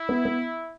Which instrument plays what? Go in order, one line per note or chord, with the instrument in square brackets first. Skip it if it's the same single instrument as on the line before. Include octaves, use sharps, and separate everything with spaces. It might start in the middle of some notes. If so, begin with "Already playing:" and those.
Already playing: [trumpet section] E4
[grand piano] B3
B3